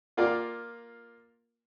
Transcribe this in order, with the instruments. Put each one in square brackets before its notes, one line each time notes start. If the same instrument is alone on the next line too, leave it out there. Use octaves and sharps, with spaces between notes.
[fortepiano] A#3 F4 A#4 D5 F5 A#5